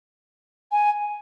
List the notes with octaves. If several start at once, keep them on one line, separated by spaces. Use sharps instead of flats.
G#5